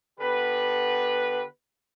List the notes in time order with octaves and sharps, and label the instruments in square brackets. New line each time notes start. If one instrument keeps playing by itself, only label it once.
[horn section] D3 B3 G4 B4